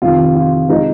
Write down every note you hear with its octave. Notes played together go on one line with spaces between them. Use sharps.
F2 C3 D#3 F4
F4
C3 F3 G#3 D#4